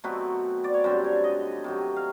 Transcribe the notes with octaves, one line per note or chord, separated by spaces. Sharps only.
B2 F#3 A3 C4 B4
D5
C#5
F#2 D3 G3 C4 C5
C#5
D#5
C3 D#3 F#3
F5